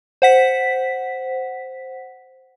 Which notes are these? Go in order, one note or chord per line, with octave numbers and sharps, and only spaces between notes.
C5 F#5 B6